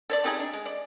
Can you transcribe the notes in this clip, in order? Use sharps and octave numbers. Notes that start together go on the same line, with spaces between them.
A4 C#5 D5
C4 D#4 G4 G#4
D4
G#3
D5